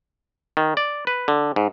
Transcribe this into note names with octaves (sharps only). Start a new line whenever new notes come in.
D#3
D5
B4
D3
G#2